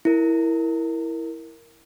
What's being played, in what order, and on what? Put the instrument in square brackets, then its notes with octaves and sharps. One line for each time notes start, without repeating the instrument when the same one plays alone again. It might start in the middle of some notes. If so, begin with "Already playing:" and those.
[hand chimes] E4 A#4